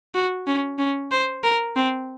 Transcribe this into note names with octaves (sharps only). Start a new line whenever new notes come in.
F#4
C#4
C#4
C5
A#4
C4